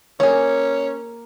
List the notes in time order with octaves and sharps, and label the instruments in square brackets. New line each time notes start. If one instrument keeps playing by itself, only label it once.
[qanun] A#3 [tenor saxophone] C#4 [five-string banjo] G#4 C#5